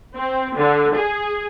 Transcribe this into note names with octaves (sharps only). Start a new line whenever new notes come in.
C4
D3
G#4